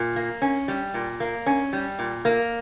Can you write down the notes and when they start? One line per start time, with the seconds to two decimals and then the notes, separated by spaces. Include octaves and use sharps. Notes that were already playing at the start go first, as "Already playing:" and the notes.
Already playing: A#2
0.16 A#3
0.42 C#4
0.68 G3
0.94 A#2
1.20 A#3
1.46 C#4
1.73 G3
1.99 A#2
2.25 A#3